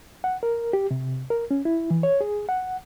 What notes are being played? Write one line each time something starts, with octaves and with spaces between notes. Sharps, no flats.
F#5
A#4
G4
C3
A#4
C#4
E4
E3
C#5
G#4
F#5